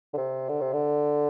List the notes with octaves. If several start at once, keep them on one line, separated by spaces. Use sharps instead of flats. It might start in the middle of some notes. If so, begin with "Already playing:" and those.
D3
C3
D3
C3
D3